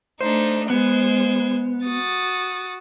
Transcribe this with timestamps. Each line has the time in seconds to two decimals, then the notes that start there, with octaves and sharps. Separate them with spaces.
0.21 A3 D4 D#4 C5
0.70 G#3 B3 C5 G#6
1.85 F#4 D#6 A6